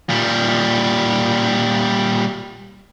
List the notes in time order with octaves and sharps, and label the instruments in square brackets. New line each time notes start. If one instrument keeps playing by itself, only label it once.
[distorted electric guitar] A#2 G3